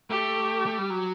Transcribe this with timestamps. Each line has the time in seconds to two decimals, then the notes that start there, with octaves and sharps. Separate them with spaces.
0.10 A3 G4
0.66 A3
0.78 G3
0.90 F#3